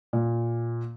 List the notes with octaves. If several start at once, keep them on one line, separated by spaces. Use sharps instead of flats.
A#2